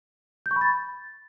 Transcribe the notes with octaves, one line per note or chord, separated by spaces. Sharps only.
G6
C#6
B5
A6